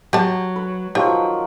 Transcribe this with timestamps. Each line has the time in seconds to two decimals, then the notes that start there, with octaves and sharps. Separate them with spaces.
0.13 F#3 G4 A5
0.56 B4
0.95 D#3 F3 F#3 G4 G5